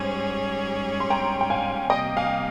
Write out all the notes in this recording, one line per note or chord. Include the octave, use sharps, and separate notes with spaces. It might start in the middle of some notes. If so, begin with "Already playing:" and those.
Already playing: G#2 G3 C#4 G#4 C5 C#5 G#5
C6
G5 A#5
G5
F5 G#5
C3 G3 A#3 D#5 G5
F5 G#5